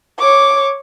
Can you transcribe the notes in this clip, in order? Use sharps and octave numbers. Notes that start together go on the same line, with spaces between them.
C#5 D6